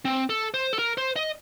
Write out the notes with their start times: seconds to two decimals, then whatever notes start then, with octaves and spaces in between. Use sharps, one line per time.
0.05 C4
0.30 A4
0.54 C5
0.73 A4
0.79 A#4
0.98 C5
1.16 D#5